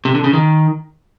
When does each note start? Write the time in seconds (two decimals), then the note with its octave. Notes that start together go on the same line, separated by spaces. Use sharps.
0.05 C3
0.15 D3
0.24 C#3
0.33 D#3